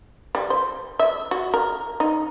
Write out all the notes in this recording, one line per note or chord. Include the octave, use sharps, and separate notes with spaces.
G3
C5
E5
F#4
A#4
D#4